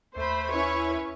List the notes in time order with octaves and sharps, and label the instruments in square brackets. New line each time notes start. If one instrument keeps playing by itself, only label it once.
[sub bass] D#2 [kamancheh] A3 B5 [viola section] C5
[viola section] C#4 E4 E5 [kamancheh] B4 C#5